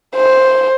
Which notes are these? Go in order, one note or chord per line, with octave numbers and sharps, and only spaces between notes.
C5